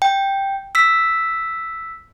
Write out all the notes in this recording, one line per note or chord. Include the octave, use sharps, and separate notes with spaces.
G5
E6 B6